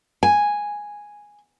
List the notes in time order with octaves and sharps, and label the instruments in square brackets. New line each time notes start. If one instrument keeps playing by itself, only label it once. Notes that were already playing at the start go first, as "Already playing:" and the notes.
[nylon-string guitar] G#5